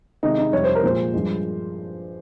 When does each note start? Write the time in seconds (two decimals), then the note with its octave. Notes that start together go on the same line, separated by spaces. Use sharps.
0.23 C3 D#3 G#3 D#4
0.38 D#4
0.53 F2 C3 G3 C#5
0.64 C5
0.75 A#4
0.83 A#2 F3 G#3 C5
1.14 G2 F3 G#3